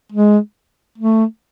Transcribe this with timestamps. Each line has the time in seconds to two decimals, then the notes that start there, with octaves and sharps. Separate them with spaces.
0.12 G#3
0.98 A3